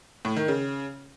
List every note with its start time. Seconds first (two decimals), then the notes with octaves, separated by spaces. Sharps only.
0.25 A2
0.36 D#3
0.48 C#3